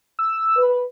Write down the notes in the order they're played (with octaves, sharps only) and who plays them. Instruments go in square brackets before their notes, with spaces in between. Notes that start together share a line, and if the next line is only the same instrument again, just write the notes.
[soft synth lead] E6
[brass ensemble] B4